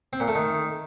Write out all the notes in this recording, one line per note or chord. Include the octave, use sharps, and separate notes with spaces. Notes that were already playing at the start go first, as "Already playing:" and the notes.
C4
A#2
A3
D#3